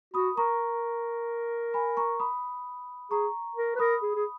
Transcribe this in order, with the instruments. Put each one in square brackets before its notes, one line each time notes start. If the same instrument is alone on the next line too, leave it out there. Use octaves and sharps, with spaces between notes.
[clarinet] F#4 [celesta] B5 D#6
[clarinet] A#4 [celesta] A#5 C#6
[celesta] G#5 B5
A#5 C#6
B5 D#6
[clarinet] G#4 [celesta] A#5 C#6
[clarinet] A#4
B4
[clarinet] A#4 [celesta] B5 D#6
[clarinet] G#4
G#4